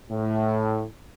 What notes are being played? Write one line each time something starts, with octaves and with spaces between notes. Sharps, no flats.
A2